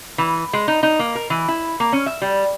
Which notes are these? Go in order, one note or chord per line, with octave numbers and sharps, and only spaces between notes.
E3
G#3
D#4
D#4
A#3
A#4
E3
E4
A#3
C#4
E5
G3